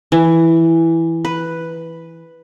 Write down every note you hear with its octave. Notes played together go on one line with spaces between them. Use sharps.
E3
B4